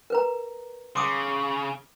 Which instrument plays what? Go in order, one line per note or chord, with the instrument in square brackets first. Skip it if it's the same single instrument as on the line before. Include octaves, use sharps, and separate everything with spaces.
[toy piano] A#4 B4 A#5
[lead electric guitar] C#3 [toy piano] C6 D6 D#6